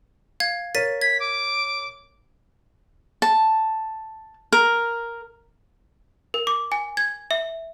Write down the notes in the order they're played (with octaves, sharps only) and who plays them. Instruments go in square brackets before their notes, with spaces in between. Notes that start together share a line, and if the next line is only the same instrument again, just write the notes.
[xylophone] F5 G#6
[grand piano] A#4 C#5 [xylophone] A6 B6 D#7
[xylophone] G#6 [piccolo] B6
[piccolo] D6
[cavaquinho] A5
A#4
[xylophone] A#4
D6
G#5
G#6
E5